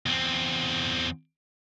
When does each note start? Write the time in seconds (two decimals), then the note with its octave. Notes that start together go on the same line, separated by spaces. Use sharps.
0.06 E2 C4